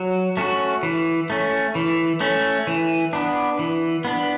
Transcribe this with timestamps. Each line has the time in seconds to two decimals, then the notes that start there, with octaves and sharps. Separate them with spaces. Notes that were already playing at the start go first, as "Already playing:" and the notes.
Already playing: F#3
0.37 A3 C#4 F#4
0.83 E3
1.30 A3 C#4
1.75 E3
2.20 A3 C#4
2.67 E3
3.13 B3 D4
3.59 E3
4.05 B3 D4